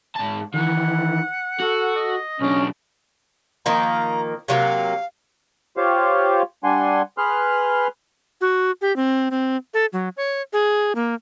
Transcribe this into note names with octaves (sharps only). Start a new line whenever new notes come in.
G#2 A5
D#3 E3 F#5
F#4 A4
D#5
B1 C#4 D4
D#3 F3 A#3 A#5
C3 F#3 A#3 F5
F4 G4 C5 C#5 F5
G3 D4 F#5 G#5 C6
G#4 B4 C6 F6 F#6
F#4
G4
C4
C4
A4
F#3
C#5
G#4
A#3